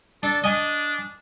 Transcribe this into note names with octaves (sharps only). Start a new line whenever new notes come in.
D4 A4
D4 D#5 G#5